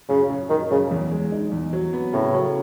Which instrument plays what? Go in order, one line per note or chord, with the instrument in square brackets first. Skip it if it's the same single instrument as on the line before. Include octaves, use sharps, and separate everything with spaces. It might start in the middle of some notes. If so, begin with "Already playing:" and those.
[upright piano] F#2 [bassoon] C#3
[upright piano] F#2
[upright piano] F#2 [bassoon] D#3
[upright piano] F#2 [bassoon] C#3
[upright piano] E2
G#3
D#4
E2
F#3
B3
[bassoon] A2 [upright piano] C#3
[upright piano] F#3